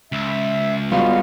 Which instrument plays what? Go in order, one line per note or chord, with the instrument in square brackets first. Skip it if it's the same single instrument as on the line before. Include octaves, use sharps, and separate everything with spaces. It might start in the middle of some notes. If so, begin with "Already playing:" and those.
[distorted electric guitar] C#2 [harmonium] E5
[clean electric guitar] G3 B3 F4 [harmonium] G#3 F#4 [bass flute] F5